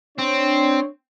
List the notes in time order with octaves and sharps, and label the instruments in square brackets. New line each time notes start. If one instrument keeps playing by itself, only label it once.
[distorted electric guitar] C4 [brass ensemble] D4 C#5